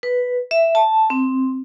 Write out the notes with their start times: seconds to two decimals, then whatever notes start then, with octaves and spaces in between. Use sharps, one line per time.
0.03 B4
0.51 E5
0.75 A5
1.10 C4